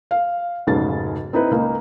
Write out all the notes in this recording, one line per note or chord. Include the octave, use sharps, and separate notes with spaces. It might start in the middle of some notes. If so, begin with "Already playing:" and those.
F5
F1 B1 G#2 C#3 G#3 A6
C4 D#4 E4 B4
C#2 A#3 D#4